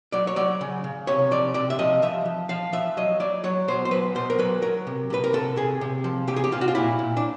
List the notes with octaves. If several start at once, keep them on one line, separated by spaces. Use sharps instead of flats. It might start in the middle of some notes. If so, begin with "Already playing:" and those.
F#3 D5
C#5
F#3 D5
C#3
C#3
C3 C#5
F3 D5
C3 D5
E5
F3 D#5
F3 E5
F3
F3 F5
F3 E5
F#3 D#5
F#3 D5
F#3 C#5
B2 C5
C5
F#3 B4
B2 C5
A#4
F#3 B4
F#3 A#4
C3
C3 B4
A#4
C3 A4
C3 G#4
C3
F3
C3 G4
G#4
G4
C3 F4
F#4
F4
A#2 E4
A#2
D4